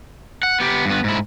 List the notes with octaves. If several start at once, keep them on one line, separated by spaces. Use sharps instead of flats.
F#5
B3 G4
G2 B3
G#2 E4